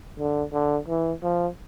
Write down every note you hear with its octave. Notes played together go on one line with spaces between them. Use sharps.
D3
D3
E3
F3